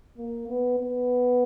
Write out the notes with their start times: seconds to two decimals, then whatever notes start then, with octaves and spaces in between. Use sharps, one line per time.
0.18 A#3
0.49 B3
0.79 B3